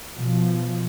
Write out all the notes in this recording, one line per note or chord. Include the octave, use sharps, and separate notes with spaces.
B2 F3